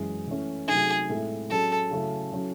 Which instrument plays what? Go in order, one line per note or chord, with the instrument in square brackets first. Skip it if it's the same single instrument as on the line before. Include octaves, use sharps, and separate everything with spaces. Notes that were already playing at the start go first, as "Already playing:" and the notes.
Already playing: [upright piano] F#2 E3 G#3 C#4 E4
E3 A3 C#4
[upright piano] C3 F#3 A3 D#4 [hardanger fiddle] G#4
[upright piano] A2 G#3 C4 E4 A4
[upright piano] F#3 C#4 G#4 [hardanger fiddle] A4
[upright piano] C#3 F#3 A3 C#4 E4
F#3 C#4 E4